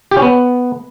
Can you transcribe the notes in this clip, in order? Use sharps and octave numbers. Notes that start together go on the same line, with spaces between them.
G4
C#4
B3